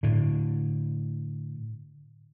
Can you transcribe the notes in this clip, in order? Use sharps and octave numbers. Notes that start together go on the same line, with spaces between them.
A2 D3